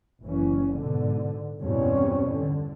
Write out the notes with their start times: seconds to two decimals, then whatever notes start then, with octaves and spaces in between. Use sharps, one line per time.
0.23 F#1 E3 C#4
0.75 G#2 B2 D3
1.60 E2 G2 B2 G3 C4 C#4
2.34 D3